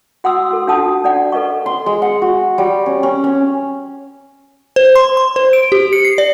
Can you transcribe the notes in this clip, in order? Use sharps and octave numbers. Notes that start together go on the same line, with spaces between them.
F#4 F#5 C6 D#6 E6
F#4 A4
D4 F4 F#5 A5 D#6
F#4
D4 D5 F#5
A4 B4 D#5 C#6
C6
G#3
F#5
F#4
G3
C#4
C#4
C#4
C5
C6
C6
C5
D7
G4
C#7
C7
D5